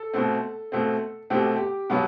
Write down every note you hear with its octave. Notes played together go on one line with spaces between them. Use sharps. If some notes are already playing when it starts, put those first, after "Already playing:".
Already playing: A4
B2 A3 C4
B2 A3 C4
B2 A3 C4 G4
G4
B2 F#3 B3